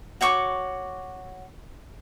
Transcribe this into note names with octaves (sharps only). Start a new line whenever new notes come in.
F#4 C#5 C#6 D6